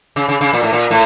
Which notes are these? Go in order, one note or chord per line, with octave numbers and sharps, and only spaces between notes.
C#3
C#3
C#3
A#2
A2
A#2
A2